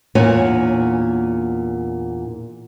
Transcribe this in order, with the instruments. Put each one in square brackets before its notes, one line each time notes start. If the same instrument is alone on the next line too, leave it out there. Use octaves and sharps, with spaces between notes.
[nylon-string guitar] E2 A#2 D4 F#4 C#5 G#5